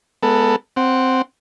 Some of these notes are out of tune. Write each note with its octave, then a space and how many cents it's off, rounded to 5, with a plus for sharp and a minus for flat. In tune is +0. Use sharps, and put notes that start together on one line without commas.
G#3 +25 B3 -5 A4 +25
C4 -5 F#5 +0